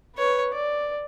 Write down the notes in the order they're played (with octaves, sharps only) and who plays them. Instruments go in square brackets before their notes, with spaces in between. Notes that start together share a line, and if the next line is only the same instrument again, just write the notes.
[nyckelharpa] B4 [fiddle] C#5
[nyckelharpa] D5